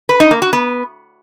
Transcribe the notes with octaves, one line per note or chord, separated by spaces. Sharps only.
B4
D#4
A#3
F#4
B3